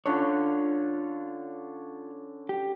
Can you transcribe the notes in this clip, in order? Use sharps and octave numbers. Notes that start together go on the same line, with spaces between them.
D3 C#4 D4 F4 C#5
G4